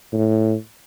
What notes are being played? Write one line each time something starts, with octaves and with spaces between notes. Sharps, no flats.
A2